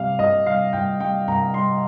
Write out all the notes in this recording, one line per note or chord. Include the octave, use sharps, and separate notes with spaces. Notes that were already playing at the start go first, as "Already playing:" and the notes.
Already playing: C2 C3 G3 F5
C2 D#5
C3 G3 F5
C2 G5
C3 G3 G5
C2 A#5
C3 G3 C6